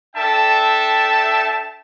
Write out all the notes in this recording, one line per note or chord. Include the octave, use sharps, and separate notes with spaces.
D4 A4 E5 G5 A5